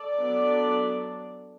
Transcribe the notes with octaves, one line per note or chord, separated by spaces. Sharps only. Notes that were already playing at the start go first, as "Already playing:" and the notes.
Already playing: A4 D5
F#3 B3 D4